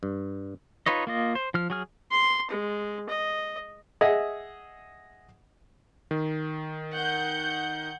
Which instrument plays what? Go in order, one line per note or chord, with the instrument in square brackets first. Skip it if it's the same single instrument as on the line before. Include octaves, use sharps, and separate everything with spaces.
[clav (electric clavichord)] G2
[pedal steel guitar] D#4 F4 B4 C#5 D#5
A#3 F4 D#5
C5
F3 F6
F#3 G#4 F6
[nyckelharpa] C6
G#3
D#5
[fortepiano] G#4 D#5 E5 F#5
[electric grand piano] D#3
[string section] F#5 G6